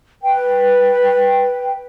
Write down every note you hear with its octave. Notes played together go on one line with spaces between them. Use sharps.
B4 G5